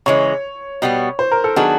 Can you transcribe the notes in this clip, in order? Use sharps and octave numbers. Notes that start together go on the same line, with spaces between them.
C#3 E3 G#3 C#5
B2 G3 B3
C5
A#4
A4
D#3 F#3 B3 D4 F#4 G#4